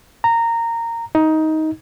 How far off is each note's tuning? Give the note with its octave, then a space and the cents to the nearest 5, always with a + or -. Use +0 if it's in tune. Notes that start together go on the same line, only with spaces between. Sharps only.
A#5 -15
D#4 +15